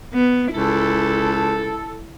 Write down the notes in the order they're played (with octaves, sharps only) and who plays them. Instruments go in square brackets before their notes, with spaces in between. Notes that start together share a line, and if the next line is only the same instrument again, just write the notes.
[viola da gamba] B3
[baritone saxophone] C#2 [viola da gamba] E4 [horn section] A4